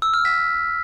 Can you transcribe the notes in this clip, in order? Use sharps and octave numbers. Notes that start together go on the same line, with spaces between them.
E6
F6
B6